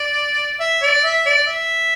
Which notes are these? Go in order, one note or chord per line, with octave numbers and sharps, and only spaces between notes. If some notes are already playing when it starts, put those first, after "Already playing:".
Already playing: D5
E5
D5
E5
D5
E5